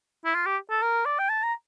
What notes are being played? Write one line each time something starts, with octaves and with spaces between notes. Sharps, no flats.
E4
F4
G4
A4
A#4
D5
G5
A5
A#5